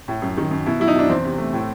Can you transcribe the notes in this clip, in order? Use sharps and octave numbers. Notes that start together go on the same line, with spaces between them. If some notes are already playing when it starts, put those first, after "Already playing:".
A2
F#2
D#3
F#2
B2 E4
F#3 E4
D#4
B2 D4
E2 C4
C3
A3
A2